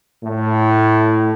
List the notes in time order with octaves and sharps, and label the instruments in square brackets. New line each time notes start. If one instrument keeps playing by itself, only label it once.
[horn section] A2